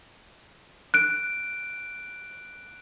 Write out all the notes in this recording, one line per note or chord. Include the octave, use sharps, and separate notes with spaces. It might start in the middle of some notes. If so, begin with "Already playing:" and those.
F#6 D7